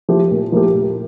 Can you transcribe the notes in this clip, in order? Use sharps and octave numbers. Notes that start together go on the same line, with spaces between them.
F3 A#3 E4 G4
A#2
F3 A#3 E4 G4
A#2